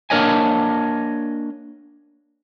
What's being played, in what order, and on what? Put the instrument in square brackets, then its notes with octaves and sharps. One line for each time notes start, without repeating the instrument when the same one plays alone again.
[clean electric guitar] A#3 D4 A#4 C#5 D#5 G#5